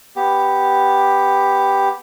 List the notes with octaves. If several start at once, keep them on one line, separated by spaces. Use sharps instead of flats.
B3 G4